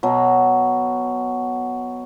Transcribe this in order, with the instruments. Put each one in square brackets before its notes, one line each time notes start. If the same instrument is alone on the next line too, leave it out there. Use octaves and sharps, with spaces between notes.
[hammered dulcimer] B2 F#3